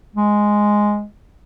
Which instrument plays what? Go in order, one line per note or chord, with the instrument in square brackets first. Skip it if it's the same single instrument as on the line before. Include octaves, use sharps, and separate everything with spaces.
[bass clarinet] G#3